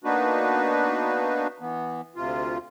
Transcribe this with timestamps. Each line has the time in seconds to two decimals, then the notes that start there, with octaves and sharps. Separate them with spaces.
0.04 A#3 B3 D4 D#4 F#4 B4
1.61 E3 B3
2.16 D2 C3 F4